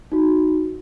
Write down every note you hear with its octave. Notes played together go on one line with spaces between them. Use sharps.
D#4 F#4